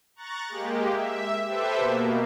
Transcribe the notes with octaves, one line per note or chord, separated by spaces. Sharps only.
A#5 C#6 F#6 A6
G#3 A#3 G4
E5
G4 A4 B4 C5 E5
B2 A#3